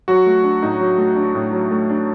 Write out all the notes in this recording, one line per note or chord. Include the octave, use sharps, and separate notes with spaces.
F#3 F#4
A3
D4
A2 D#4
F#3
A3
D4
A2
F#3
A3
D4